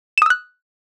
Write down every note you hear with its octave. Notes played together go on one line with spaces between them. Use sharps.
D#6 E6 F#6 E7